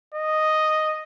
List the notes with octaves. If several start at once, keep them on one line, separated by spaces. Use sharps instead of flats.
D#5